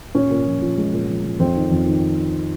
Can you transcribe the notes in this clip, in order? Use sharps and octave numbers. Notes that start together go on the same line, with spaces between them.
A#2 C#4
A#2
F3
F3
G#3
A#2
F3
F3
F2 C4
D#3
F2
D#3